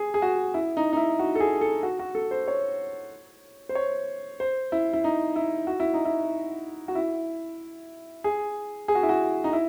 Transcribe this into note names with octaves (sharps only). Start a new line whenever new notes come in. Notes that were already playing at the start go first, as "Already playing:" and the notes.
Already playing: G#4
G#4
F#4
E4
D#4
D#4
E4
F#4
A4
G#4
A4
F#4
F#4
A4
C5
C#5
C5
C#5
C5
E4
E4
D#4
E4
F#4
E4
D#4
E4
F#4
E4
G#4
G#4
F#4
E4
F#4
D#4
E4